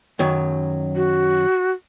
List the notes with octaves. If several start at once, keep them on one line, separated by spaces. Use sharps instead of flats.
F#2 D#3 F#3
F#4